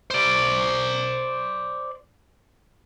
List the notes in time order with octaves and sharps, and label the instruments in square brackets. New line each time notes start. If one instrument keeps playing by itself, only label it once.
[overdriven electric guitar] C5 D5